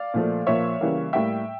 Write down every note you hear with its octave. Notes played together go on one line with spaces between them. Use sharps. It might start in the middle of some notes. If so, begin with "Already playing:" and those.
Already playing: D5 F5
A#2 F3 A3
A#2 F3 A#3 C#5 E5
C#3 E3 G3 A#3
A2 G3 A#3 E5 G5